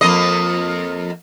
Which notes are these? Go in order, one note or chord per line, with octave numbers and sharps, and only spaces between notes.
F2 A#3 D#5